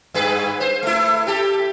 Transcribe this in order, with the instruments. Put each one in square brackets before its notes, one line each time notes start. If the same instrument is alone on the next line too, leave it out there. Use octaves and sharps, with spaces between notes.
[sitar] G2 G#4 B4
C5
A3 E4
G4 A4